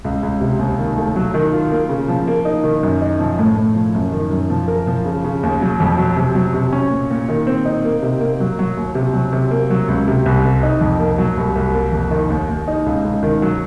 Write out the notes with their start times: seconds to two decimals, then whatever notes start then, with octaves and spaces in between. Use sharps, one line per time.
0.04 C#2
0.23 C#2
0.41 C3
0.59 D#2
0.78 D#3
0.97 A3
1.16 F#3
1.34 D#3
1.52 F4
1.72 A#3
1.89 C#3
2.08 F3
2.27 A#3
2.45 D#4
2.64 D#3
2.83 F#2
3.02 D#4
3.20 F3
3.39 A2
3.56 A2
3.75 F3
3.95 F#2
4.12 D#3
4.31 F#2
4.50 F3
4.68 A#4
4.87 F3
5.05 C#3
5.24 C#3
5.43 D#2
5.62 F#3
5.80 F2
5.98 F#3
6.16 C3
6.35 F#3
6.54 C3
6.72 C#4
6.91 A#2
7.10 A#2
7.29 D#3
7.47 C4
7.65 D#4
7.85 A#3
8.02 C3
8.21 A#3
8.40 F#3
8.59 F#3
8.77 D#2
8.95 C3
9.14 F#3
9.33 C3
9.51 A#3
9.70 F#3
9.89 C#2
10.08 C3
10.26 C2
10.45 C3
10.63 D#4
10.81 F2
11.00 A#3
11.18 F#3
11.37 C2
11.56 C2
11.74 A#3
11.92 F2
12.11 D#3
12.30 D#2
12.49 D#2
12.68 D#4
12.86 C#2
13.04 C#2
13.23 D#3
13.42 F#3